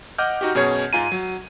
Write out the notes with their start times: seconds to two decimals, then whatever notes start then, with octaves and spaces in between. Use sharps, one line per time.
0.18 D#5 F#5 D6 F6 G6
0.41 D#4 F#4 G4
0.55 F#2 B2 C#4 G#4 C#5 G#6
0.93 G#2 F4 G#5 A#5 D#7
1.12 F#3